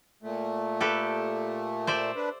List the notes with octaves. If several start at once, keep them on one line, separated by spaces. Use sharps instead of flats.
A#2 A3
G4 A4 B4
C5 D5 E5
D4 B4